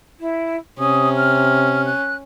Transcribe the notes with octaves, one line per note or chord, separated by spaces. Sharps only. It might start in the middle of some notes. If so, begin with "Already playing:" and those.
E4
C3 C#4 D#6
F6
F#6